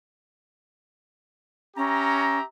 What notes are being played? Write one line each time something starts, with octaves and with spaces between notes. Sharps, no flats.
C#4 G4 E5 A#5